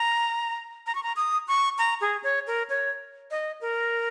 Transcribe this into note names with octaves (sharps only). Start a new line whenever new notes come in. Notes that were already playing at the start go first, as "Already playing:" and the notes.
Already playing: A#5
A#5
C#6
A#5
D#6
C#6
A#5
G#4
C#5
A#4
C#5
D#5
A#4